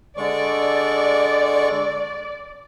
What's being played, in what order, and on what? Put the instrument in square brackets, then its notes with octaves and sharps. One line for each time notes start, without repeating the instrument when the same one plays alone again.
[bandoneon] D3 G#3 C#6 [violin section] D5